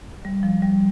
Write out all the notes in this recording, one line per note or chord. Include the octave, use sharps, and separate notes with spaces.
G3
F3
G3